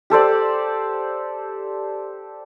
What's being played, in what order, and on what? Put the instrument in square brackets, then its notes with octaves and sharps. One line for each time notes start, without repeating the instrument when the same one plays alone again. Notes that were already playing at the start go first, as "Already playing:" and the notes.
[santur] G4 A4 C5 D5